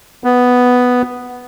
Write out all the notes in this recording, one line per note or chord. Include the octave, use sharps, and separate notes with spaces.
B3